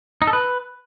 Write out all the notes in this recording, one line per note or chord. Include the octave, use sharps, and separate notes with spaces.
D#4
A4
B4